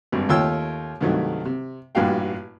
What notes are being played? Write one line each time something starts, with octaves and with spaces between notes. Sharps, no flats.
G#1 G2
D#2 A3 F4 C#5 G5 E6
C2 G2 D#3 F#3 A3
C3
A1 G2 A#2 F#4 F5 G5